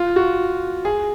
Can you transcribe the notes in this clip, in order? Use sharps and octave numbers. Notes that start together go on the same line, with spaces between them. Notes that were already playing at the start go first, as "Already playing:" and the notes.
Already playing: F4
F#4
G#4